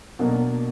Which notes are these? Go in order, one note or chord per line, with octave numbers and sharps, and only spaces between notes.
B2 F#3 A#3 D4